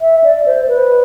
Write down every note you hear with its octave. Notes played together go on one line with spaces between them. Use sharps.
E5
D5
C5
B4